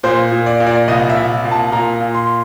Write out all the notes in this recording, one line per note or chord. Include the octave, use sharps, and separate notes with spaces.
A#2 C5
A#2
D5
A#2
D5
C2 D#5
E5
C2
A#2
A5
A#2 A#5
A#2
C6